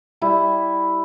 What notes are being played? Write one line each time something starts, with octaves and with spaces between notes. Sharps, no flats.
G3 E4 G4